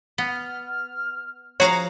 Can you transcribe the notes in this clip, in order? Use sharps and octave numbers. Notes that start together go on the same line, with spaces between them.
B3 F6
F3 F#4 G#4 C#5 F5 A#5 A#6